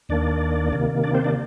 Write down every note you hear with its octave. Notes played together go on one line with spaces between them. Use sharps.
D#2 D#3 A#3 D4 D5
C3 D#3 A#3
D4 D5
C4 C5
D4 D5